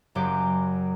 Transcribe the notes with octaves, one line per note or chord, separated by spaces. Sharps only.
F#1 F#2 G4 D6